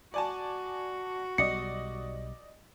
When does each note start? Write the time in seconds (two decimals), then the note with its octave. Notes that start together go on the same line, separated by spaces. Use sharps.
0.14 F#4 D5 G#5 A5
1.38 B1 G3 D5 D#5 C#7